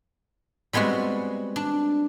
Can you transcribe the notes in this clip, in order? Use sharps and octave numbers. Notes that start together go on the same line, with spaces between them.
G3 G#3 B3 C4 F#4
D4